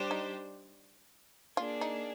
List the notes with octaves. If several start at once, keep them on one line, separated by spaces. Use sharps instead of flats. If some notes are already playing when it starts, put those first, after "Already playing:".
Already playing: G3 D4 G4 C5
D#4
A#3 D4 F4 G#4
D#4